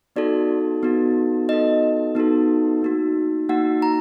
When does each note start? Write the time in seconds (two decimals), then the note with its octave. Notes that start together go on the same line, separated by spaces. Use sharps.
0.16 B3 D#4 F#4 A4 D5
0.83 B3 D#4 F#4 A4
1.49 B3 D#4 F#4 A4 D#5
2.15 B3 D#4 F#4 A4
2.82 A#3 D#4 F#4
3.49 A#3 D#4 F#4 F#5
3.82 A#5